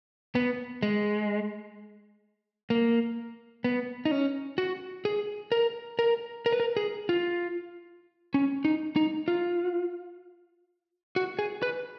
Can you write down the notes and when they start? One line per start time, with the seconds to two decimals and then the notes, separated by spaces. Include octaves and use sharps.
0.35 B3
0.83 G#3
2.70 A#3
3.64 B3
4.05 D#4
4.11 C#4
4.58 F#4
5.05 G#4
5.52 A#4
5.99 A#4
6.46 A#4
6.52 B4
6.60 A#4
6.77 G#4
7.09 F4
8.34 C#4
8.65 D#4
8.96 D#4
9.28 F4
11.16 F#4
11.39 G#4
11.62 B4